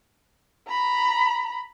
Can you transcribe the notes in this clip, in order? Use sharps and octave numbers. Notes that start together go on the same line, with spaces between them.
A#5 B5